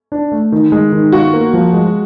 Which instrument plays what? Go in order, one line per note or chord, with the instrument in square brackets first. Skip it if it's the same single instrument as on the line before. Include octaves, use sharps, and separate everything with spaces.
[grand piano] D4
A3
D#3
G#3
D#3
[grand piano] F4 [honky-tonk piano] F#4
[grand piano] A#3
F3
G#3